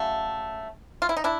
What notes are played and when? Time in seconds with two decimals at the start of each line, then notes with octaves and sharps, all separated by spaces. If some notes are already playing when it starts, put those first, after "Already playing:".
Already playing: C#3 F#3 A3
1.02 F4
1.09 E4
1.17 D#4
1.24 D4 E4